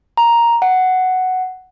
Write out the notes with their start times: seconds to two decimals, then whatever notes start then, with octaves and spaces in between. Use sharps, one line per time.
0.17 A#5
0.62 F#5